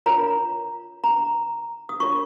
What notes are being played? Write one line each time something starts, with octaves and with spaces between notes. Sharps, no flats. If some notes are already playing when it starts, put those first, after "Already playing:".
F4 A#4 C#5 A#5
A#5
D#6
F4 A#4 C#5 C#6